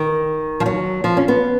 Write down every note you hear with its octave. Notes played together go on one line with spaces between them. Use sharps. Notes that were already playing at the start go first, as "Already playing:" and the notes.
Already playing: D#3
F3
F#3
F3
C#4
B3